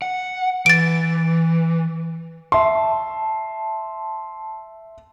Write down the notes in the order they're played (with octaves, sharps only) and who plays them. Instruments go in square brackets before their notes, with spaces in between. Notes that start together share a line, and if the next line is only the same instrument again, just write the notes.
[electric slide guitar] F#5
[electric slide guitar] E3 [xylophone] A6 D7
[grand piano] E5 C6 [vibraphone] A5